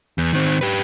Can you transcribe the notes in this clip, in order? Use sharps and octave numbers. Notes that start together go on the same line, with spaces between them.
E2
D#3 C4
G4 B4